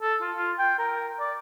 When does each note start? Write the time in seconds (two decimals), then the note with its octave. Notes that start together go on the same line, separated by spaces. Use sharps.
0.02 A4
0.21 F4
0.36 F4
0.59 G5
0.79 A#4
1.20 D5